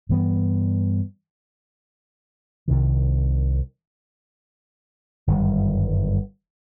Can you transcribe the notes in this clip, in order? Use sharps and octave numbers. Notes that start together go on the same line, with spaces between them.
G2 E3 G3 B3
C2 C3 D#3
G1 F#2 D#3 G3